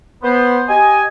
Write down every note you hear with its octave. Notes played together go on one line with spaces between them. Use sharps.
B3 C5
G4 D#5 G#5